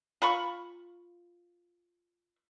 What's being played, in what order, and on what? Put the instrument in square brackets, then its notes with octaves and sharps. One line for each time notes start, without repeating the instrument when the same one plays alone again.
[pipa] F4 B5 C#6